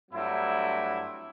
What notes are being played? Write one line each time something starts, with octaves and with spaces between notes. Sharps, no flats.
G2 F#3 A3 C4 E4